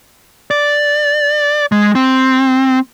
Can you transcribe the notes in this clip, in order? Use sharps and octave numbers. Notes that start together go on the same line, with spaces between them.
D5
G#3
C4